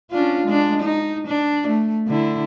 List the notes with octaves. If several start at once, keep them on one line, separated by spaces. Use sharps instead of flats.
C#4 D4 F4
G#3 D4
D#4
D4
A3
D3 E4